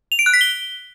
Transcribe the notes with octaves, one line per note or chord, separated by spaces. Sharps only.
F7
D7
F#6
B6
G7